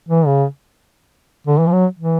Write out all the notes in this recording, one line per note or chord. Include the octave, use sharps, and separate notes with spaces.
E3
C#3
D3
E3
F3
F#3
E3